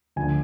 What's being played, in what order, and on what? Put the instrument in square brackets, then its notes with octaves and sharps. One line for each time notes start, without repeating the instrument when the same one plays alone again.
[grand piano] D2 D3 F3 G#5